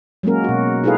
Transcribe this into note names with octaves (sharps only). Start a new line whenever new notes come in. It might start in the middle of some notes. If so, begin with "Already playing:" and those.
F#3 G#3 A#3 C#4 A#4
B2 F#4
D#4 E4 G#4 A4 B4 F5